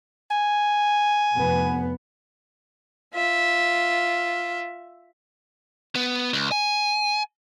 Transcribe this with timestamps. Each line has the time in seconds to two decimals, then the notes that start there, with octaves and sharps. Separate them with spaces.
0.31 G#5
1.36 F1 B3
3.14 F4 E5
5.96 B3
6.33 C#2
6.52 G#5